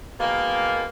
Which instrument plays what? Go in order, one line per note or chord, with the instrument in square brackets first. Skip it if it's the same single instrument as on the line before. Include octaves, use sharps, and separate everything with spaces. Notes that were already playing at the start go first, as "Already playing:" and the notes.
[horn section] B2 D#3 G#3 A#3